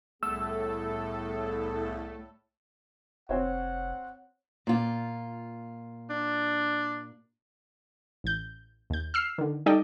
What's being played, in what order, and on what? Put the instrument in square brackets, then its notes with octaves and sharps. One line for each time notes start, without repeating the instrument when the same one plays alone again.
[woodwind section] C2 B3 G#4 [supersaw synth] A2 A4 [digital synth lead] A3 [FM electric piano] E6
[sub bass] F1 [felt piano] C4 C5 C#5 [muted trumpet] F#5
[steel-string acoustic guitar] A#2 F4
[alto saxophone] D4
[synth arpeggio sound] A1 G6
D#2 G6
E6 F6 C7
D3 D#3
G3 D#4 A4 D5 D#5 G5